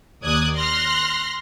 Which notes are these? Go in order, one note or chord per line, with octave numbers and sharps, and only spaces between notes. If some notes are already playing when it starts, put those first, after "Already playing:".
D#2 D5 D#6 F#6 G#6
C6 F6 F#6 A#6